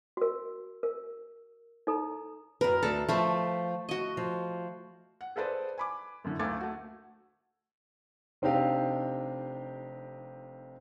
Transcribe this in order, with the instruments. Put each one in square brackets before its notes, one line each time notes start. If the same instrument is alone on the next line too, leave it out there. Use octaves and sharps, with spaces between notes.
[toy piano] F#4 A#4
A#4
D#4 A4 A#5
[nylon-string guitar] F#2 B4 [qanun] A#4
[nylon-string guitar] D2 A3 [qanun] A4
[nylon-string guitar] F3 [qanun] A3 B5
[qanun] F#4 D#5
[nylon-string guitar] F3
[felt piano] F#5
G#4 A4 B4 C5 D5
G#5 B5 D6
F#2 A2 D3
D2 A3 A#3 D6 G#6 A6
A3 F#4
[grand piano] F1 C4 D4 D#4 G4 F5